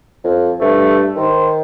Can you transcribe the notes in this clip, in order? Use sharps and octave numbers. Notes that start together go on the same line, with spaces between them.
F2
G2 A3
D#3 C5